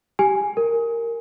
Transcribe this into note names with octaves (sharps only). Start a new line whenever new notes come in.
G4 G#5
A#4